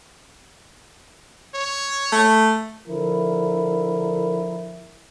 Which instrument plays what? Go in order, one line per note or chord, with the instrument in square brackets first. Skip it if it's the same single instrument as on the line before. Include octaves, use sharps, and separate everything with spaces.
[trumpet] C#5
[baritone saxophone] A3
[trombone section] D3 F3 E4 A#4